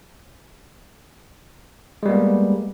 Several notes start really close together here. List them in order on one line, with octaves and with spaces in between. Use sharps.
G#3 G3 A#3 B3